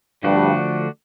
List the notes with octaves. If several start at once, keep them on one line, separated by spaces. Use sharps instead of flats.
G2 D3 F3 A3 D4 F#4